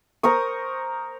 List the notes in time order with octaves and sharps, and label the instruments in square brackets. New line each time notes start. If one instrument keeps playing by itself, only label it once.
[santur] A#4 C5 C#6 D#6